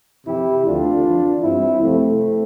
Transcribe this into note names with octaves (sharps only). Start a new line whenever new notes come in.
F2 C3 E3 E4 G4
D2 D3 F3 D4 F4
F2 E3
G2 E3 C4 E4
F2 C3 F3 A3 C4